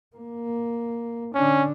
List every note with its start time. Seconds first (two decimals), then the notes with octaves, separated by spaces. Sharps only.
0.16 A#3
1.35 D3 C#4 D4